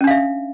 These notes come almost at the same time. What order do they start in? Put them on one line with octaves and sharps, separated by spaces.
C#4 D4 F5 E5